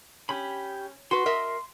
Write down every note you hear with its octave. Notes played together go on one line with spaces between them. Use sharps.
C#4 G4 B5
F#4 B4 C6
A#4 D#5 E5